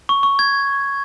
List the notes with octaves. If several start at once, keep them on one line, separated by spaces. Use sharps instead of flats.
C#6
C#6
G#6